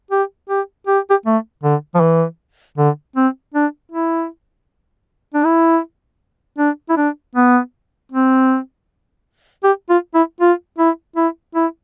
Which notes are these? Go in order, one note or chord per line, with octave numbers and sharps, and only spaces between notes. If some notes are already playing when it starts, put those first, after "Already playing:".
G4
G4
G4
G4
A3
D3
F3
E3
D3
C4
D4
E4
D4
E4
D4
E4
D4
B3
C4
G4
F4
E4
F4
E4
E4
E4